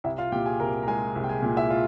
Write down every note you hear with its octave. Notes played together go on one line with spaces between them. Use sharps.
C2 E4 E5
F4 F5
A#2 G4 G5
G#4 G#5
C2 A#4 A#5
A#5
G#3 G#4 G#5
C2
G5
G#4 G#5
A#2
E4 E5
F4